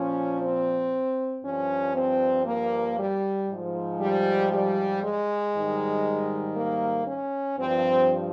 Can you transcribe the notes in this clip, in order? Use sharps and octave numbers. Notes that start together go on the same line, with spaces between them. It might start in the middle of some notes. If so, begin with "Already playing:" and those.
Already playing: A#2 F3 C#4
C4
G2 F3 C#4
C4
A#3
G3
G#2 F3
G3
G3
G#3
G#2 D#3 G3
A#3
C#4
G2 F3 C4